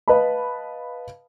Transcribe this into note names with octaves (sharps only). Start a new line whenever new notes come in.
B4 D#5 F5 A5 B5